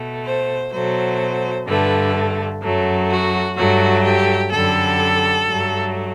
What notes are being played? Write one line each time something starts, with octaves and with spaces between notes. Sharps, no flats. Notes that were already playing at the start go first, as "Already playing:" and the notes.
Already playing: B2 A3
C5
B2 F#3 A3 C5
G2 D3 A3 B4
F#2 F#3 A3
F#4
G2 F#3 A3 F#4
G4
F#2 D3 G3 A4
G2 F#3 A3